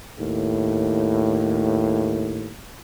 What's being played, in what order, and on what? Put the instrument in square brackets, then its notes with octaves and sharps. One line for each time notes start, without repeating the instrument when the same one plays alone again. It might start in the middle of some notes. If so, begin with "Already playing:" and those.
[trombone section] D#2 A2